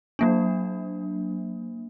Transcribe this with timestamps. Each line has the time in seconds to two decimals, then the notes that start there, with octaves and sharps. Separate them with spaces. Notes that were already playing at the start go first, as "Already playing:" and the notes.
0.19 F#3 A#3 D4